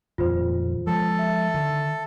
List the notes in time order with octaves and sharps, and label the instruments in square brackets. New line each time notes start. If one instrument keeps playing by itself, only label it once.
[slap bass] D#1 F2 [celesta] F4 C5
[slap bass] F3 G#3 [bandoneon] A4
[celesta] E5
[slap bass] D3 D#3